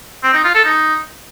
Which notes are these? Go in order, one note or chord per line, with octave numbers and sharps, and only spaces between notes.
C4
D#4
F4
A4
D#4